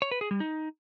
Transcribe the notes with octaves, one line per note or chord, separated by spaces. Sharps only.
C#5
B4
G#4
G3
D#4